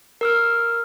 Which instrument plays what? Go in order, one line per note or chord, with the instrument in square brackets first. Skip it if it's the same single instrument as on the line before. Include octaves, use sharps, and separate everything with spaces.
[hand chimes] A#4 E6 F6